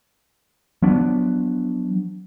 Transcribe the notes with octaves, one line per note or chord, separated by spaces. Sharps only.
F3 F#3 B3 D4